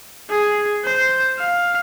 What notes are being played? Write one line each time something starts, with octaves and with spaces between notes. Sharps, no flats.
G#4
C5
F5